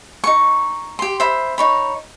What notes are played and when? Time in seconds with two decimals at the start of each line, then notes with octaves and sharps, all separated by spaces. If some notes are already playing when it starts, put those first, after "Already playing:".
0.24 D#4 C#6
0.99 G4 C6
1.20 C5 E5 B5
1.58 D#4 C#5 B5